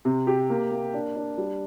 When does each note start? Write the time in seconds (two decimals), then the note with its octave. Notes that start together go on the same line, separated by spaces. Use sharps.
0.05 C3
0.27 G4
0.50 A#3
0.71 A#3
0.93 D4
1.16 D4
1.38 G3